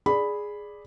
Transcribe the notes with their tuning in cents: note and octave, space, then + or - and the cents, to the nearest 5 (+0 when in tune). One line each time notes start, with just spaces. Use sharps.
G#4 +0 D5 +0 B5 +0